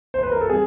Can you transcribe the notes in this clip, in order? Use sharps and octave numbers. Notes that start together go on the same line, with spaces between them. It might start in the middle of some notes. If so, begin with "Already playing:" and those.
C5
B4
A#4
A4
G3 C4 G#4